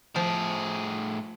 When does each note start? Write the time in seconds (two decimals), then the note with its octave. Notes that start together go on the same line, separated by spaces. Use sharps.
0.16 A2 F3 G#4